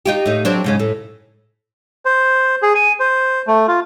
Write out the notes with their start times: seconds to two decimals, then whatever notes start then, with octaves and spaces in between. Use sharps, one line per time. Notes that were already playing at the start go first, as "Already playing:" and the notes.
0.06 D#4 F4 G4
0.26 A2 D#4
0.45 F#3 C4 D4
0.64 G#2 C#3 C#4
0.80 A2
2.05 C5
2.62 G#4
2.75 G#5
3.00 C5
3.47 A3
3.68 F4